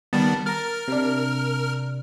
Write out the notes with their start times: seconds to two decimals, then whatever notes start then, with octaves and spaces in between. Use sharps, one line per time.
0.13 D#3 G3 B3 A5
0.46 A#4 A#5 F6 A6
0.88 C3 D4